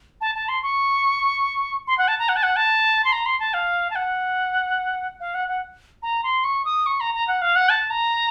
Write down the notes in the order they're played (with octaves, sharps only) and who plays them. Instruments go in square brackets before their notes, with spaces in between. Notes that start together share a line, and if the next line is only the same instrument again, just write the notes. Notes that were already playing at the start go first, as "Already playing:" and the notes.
[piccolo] A5
A5
C6
C#6
C6
F#5
A5
A#5
F#5
A5
F#5
A5
C6
A#5
C6
A5
F5
A5
F#5
F5
F#5
F#5
A#5
C6
C#6
D#6
C#6
A#5
A#5
F#5
F5
F#5
A5
A#5